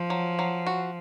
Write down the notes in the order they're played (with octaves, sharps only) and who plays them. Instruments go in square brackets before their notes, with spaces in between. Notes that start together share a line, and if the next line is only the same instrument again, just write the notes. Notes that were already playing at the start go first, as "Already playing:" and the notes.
Already playing: [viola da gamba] F3
[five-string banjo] F#3
F#3
F#4